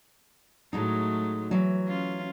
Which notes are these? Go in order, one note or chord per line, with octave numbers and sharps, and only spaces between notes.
A2 F#3 G#3 A3 D#4
E3 F#3
C#4 F4